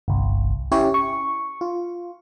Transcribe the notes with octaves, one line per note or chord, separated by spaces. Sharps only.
G1 C2
C#4 E4 G4 C#5
C#6
F4